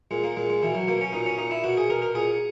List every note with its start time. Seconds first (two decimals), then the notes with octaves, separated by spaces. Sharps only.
0.11 A#2 G#3
0.24 A#3
0.37 A#2 G#3
0.50 G#3
0.63 B2 E3
0.75 F#3
0.87 B2 A#3
1.01 C#4
1.13 A#2 D#4
1.26 C#4
1.38 A#2 D#4
1.51 E4
1.64 B2 F#4
1.77 G#4
1.90 B2 A#4
2.02 A#4
2.15 A#2 G#4